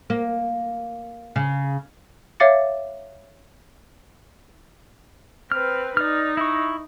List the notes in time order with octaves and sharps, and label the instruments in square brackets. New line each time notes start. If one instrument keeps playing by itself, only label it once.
[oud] A#3
C#3
[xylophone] C#5 E5 F5 D6 A6 C#7
[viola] C4 B4 [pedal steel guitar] F6
[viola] D#4 [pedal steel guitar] D5 F6
[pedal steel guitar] E4 C#6